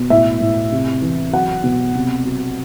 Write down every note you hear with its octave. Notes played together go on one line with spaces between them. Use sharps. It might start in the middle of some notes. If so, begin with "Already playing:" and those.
Already playing: B2
A2 E5
A2
C3
E3
F#3 F#5
B2
C3
F#3